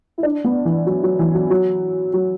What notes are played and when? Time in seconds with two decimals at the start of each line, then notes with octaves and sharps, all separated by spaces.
0.18 E4
0.23 D4
0.44 B3
0.65 E3
0.86 F#3
1.03 F#3
1.19 E3
1.34 F#3
1.50 F#3
2.14 F#3